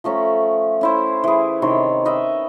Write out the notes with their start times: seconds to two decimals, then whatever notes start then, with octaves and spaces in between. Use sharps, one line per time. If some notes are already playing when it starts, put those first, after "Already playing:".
0.04 F3 A3 C#4 A#5
0.81 C#4 E4 C5
1.24 E3 G#4
1.62 C3 D#3 C#5 C6
2.05 B4 D#5 E5 G5